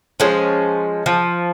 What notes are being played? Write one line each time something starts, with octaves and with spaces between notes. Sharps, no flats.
F3 G#3 C#4
F3